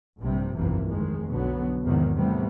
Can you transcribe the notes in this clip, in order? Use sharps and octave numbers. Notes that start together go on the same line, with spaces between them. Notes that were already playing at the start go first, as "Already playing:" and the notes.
A#1 G2 C3 G3
F1 B1 G2 C3 E3 A#3
F1 D#3 G#3
B1 D3 F#3 B3
E2 G#2 C3 D#3 F#3
A2 C3 E3 G3 A3 B3